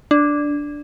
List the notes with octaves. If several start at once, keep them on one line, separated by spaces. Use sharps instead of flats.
D4